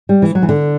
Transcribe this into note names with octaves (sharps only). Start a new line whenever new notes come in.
G3
E3
F#3
E3
D3